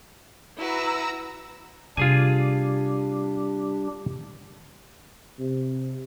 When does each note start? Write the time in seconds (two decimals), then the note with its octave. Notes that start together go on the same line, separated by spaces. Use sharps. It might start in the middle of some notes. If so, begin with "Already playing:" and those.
0.57 E4 F#4 B4 A#5 E6
1.97 C3 G3 D4 F4 G4 G#4 G#5
5.38 C3